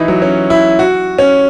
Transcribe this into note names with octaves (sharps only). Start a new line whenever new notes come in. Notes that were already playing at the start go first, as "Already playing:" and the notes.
Already playing: E3 D#4 E4
F#3
C#4
E4
F#4
C#4